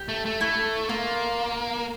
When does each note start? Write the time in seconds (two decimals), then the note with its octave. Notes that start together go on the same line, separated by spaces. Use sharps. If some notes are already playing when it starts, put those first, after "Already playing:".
Already playing: G4
0.09 A3
0.26 A3
0.41 A3 E4
0.89 A#3 F4